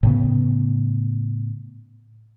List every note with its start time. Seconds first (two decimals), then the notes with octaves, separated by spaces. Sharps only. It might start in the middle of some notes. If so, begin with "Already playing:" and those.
0.03 A2 C#3 B3